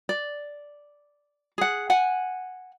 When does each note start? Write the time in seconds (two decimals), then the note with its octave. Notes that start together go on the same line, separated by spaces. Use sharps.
0.09 D5
1.58 G#4 F#5
1.90 F#5 G#5